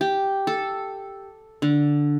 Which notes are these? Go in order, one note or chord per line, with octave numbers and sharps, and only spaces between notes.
G4
A4
D3